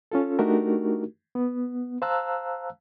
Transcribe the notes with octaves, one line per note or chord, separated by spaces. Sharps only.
C#4 F4 A4
A3 D4 D#4 F#4 G4 A#4
B3
C5 F5 A5 A#5 E6 F#6